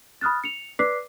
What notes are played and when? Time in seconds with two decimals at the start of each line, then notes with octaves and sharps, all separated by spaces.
0.21 B5 D#6 F6 F#6 A6
0.44 C#7 F7
0.79 B4 D5 D6 F#6 B6 C7